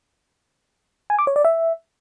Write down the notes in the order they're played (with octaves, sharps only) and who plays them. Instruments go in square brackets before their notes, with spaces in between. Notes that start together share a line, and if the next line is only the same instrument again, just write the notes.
[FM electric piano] G#5
D6
C#5
D5
E5